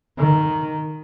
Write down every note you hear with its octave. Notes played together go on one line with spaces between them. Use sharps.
D#3